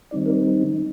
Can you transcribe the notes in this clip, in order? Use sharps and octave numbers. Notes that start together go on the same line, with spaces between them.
D#3 G3 C4 D#4 D5
A#4